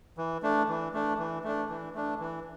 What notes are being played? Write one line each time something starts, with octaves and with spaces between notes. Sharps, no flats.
E3
A3 D4
E3
A3 D4
E3
A3 D4
E3
A3 D4
E3